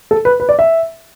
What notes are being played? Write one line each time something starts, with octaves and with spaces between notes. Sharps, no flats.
A4
B4
B4
D5
E5